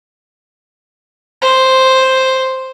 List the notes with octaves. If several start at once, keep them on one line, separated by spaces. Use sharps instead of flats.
C5